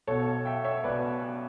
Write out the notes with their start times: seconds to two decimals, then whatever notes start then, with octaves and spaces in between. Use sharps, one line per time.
0.07 B1 B2 A4 C#5
0.45 E5 G5
0.65 C#5 E5
0.84 B1 B2 B4 D5